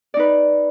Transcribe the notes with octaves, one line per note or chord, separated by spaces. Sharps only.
D#4 B4 D5